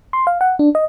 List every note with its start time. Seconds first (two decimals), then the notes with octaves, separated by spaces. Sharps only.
0.13 C6
0.27 F5
0.41 F#5
0.59 D4
0.75 D#5